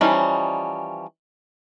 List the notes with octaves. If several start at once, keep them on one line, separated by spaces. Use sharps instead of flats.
E3 F3 G3 C#4 D#4